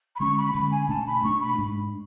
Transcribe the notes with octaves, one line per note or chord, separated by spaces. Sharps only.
B5
D3 G#3 C#4 C#6
B5
D3 G#3 C#4 B5
G#5
B2 A3 D4 A5
B5
B2 A3 D4 C#6
B5
G#2 G#3 D4